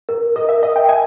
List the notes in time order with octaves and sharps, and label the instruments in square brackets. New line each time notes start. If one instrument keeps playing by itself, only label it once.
[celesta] A#4
[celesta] A#4 [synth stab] D#5
[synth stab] E5
[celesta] A#4 [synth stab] D#5
[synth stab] G5
[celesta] E5 [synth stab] G#5